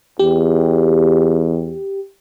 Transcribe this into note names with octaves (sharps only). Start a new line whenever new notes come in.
E2 G4